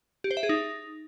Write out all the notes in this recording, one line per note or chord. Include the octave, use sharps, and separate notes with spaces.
G4
C5
E5
G#4
D#4